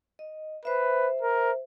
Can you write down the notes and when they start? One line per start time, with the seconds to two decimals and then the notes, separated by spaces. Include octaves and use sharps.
0.19 D#5
0.65 B4 C5 E5
1.22 A#4